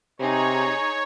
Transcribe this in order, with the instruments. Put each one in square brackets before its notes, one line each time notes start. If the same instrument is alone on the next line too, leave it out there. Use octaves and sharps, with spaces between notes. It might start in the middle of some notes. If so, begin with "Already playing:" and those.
[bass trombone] C3 [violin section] D#4 G#4 [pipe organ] C#5